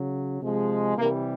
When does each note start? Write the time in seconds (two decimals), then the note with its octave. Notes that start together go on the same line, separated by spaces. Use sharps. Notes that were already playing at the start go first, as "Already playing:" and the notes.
Already playing: C#3 F#3
0.41 C3 F3 G#3
0.97 C3 E3 G3 A#3